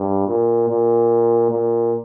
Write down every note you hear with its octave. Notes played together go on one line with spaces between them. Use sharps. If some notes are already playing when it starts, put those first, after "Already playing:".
Already playing: G2
A#2
A#2
A#2